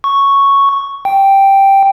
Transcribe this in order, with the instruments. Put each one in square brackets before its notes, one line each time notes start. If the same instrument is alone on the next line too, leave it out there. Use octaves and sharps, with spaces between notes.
[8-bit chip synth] C#6
G5